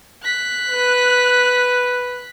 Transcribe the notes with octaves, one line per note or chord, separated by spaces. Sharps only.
F#6 B6
B4